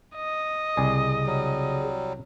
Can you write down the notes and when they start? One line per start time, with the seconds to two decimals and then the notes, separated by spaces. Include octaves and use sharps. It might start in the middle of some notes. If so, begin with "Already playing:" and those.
0.16 D#5
0.77 C2 C#3 G#4 D5
1.26 F#3 G3